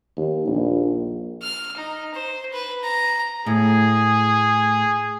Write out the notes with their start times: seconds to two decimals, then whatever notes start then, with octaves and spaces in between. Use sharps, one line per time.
0.17 D#2
0.47 A#1
1.42 F6
1.77 D#4
2.14 C5
2.53 B4
2.83 A#5
3.46 A2 G#4